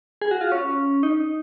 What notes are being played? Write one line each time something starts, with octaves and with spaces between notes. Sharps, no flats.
G#4
F#4
F4
C#4
D#4